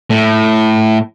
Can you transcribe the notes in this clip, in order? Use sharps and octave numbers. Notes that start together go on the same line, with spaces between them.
A2